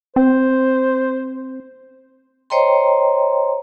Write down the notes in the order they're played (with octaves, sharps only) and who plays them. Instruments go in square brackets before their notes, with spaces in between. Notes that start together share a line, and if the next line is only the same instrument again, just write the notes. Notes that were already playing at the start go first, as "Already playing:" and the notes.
[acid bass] C4 [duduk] C5
[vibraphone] C5 C#5 D#5 G5 A#5 C6